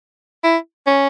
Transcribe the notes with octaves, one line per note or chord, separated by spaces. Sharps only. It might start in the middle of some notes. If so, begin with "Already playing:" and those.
E4
C#4